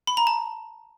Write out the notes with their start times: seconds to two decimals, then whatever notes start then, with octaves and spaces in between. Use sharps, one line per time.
0.07 B5
0.17 A#5
0.27 A5